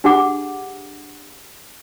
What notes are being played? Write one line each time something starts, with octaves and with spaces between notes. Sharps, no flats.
D4 G4 G#4 F#5 D6